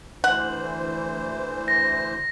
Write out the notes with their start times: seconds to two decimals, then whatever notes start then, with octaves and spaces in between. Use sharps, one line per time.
0.24 D2 E3 C5 F#5
1.68 A#6